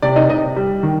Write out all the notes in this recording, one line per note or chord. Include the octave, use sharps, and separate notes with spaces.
C3 D5
D#4 D#5
C3 D#4 D#5
G3
D#3